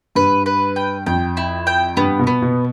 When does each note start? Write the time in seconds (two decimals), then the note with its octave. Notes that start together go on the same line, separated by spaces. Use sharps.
0.15 G2 B4
0.46 B4
0.76 G5
1.06 F2 G5
1.37 E4
1.67 G5
1.97 G2 B3
2.19 B2
2.27 B3
2.42 B2